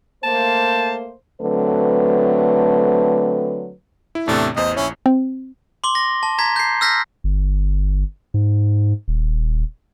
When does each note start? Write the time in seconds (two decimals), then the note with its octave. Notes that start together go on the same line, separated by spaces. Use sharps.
0.23 A3 A#3 C5 A5
1.41 D3 F#3 A3 C4 B4
4.15 E4
4.28 E2 A2 C3 A3 D4
4.56 A1 E2 C5 D#5
4.77 A#1 C#4 E4 C#5
5.06 C4
5.84 C6 D6 G7
5.95 A#6
6.23 A5
6.38 A#5 G#6 B6
6.56 G6 C7
6.81 E6 F6 G6 A#6 B6
7.24 G1
8.34 G#2
9.08 D#1